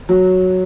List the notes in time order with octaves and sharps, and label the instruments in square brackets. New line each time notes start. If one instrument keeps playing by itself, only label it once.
[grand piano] F#3